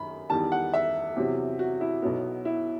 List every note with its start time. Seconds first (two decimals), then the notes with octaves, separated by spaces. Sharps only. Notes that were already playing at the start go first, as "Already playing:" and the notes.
Already playing: F#2 D#3 B5
0.30 E2 D#3 G3 A5
0.52 F#5
0.73 E5
1.16 E2 C3 F#3
1.59 F#4
1.81 E4
2.02 B1 B2 F#3 B3
2.45 E4